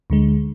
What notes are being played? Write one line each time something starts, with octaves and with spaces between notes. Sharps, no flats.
D2 D3 G#3